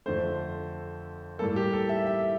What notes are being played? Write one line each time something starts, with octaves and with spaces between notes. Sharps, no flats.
F2 D3 A3 C5
A2 G3 A#3 A4
G4
A4
E5
E5